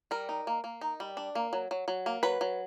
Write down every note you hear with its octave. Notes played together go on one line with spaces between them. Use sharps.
G3 A#4
D#4
A#3
A#3
D#4
G3
D4
A#3
F#3
F#3
F#3
A#3
F#3 B4
F#3